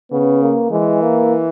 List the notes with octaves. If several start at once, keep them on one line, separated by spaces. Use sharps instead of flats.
C#3 B3
A#3
E3 G#3
A#3